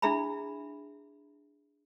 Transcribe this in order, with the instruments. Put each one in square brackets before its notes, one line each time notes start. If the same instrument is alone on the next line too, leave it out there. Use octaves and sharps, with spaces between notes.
[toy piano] D4 E4 G#4 E5 A#5 B5